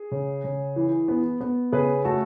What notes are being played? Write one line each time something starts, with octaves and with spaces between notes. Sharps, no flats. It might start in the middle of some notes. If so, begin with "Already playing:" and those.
Already playing: G#4
C#3
C#3
E3
B3
B3
C#3 G#4 B4
A3 F#4 A4